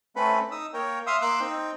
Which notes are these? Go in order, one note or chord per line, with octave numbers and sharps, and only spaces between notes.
A3 C4 C#4 A4 B4 B5
D#4 D#6 E6
A#3 A#4 C#5 G5
E5 F5 C6 D#6 E6
A#3 C6 D6 E6 F#6
C4 D#4 G5